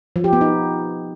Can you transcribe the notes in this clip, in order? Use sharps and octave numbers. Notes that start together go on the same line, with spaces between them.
F3
G4
B3
D#4